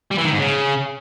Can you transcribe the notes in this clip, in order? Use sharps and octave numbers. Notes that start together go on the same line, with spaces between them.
G3
E3
D#3
G#2
C#3